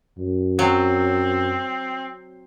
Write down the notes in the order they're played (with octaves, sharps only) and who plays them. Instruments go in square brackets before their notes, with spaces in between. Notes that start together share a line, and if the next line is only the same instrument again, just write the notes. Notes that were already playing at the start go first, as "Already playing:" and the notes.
[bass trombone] F#2
[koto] F#3 [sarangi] C4